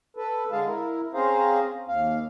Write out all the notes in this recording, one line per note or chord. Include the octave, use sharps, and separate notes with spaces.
A4 B4
D3 G#3 G#4 F5 A5
E4 A#4
C4 C#4 G#4 C5 F5 A#5
D#2 F5